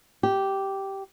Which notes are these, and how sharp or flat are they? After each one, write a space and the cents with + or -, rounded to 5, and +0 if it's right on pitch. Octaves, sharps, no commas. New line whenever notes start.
G4 -10